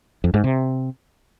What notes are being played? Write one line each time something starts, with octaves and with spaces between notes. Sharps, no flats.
F2
G#2
C3